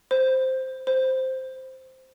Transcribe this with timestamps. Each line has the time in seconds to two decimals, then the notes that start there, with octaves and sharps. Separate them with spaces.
0.11 C5
0.87 C5